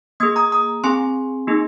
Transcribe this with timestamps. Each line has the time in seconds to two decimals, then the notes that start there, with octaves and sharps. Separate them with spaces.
0.20 A#3 G#4 D#6 G#6
0.36 A#5 D#6
0.52 A#5 D#6
0.84 C4 G#4 G#5 C6
1.47 A#3 D#4 G#4